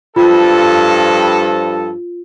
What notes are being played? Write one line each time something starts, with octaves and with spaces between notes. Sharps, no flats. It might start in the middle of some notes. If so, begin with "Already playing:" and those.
G2 F3 F4 A4